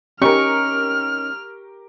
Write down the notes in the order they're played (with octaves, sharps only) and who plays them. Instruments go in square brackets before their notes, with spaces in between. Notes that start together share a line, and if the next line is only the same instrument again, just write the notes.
[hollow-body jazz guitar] C#4 D#4 [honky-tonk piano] G4 A#4 [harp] C#6 [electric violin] F6